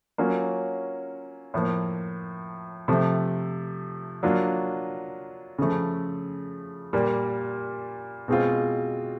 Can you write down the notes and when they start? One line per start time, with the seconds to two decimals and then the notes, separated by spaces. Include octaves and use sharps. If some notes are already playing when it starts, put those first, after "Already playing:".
0.18 F#3 A#3 C#4 F4
1.54 A2 F3 A#3
2.88 C3 F3 A3
4.23 F#3 A#3 D4 F4
5.58 C#3 F3 A3
6.93 A#2 G3 A#3
8.28 B2 G#3 C4 F4